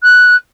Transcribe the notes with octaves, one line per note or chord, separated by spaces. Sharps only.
F#6